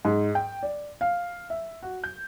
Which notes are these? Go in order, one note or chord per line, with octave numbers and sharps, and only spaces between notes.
G#2
G5
D5
F5
E5
F#4
G6